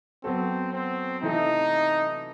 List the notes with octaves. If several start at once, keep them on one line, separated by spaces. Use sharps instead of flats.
F#3 B3 C4 F#4 A4
C4
C3 E3 A3 D#4 E4 A4